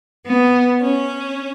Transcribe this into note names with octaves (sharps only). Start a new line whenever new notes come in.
B3
C#4